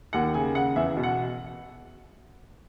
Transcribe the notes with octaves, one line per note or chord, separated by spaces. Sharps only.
D#2 F#5
C#3 G#5
C#3 F#5
E2 E5
B2
F#5